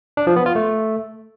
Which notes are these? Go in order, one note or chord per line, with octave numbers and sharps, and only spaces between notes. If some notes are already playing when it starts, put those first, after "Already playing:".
D4
F3
B3
F4
A3